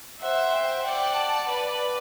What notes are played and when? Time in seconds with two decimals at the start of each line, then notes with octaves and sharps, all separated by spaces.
0.21 C5 E5 F#5
0.53 G5
0.84 D5 F#5 G5
1.16 A5
1.47 B4 D5